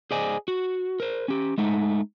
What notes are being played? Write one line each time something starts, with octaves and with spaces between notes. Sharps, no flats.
G#4 C5 D5 D#5 G#5
F#4
A#4 C5
C#4 G4
G#3 A3 D#4